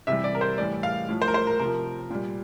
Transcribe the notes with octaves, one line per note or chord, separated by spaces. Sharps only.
C3 E3 G3 E5
D5
A#4
C5
A2 E3 G3 D5
F5
A2 F3
C5
A#4
C5
A#4
C3 F3 A#4
A#2 G3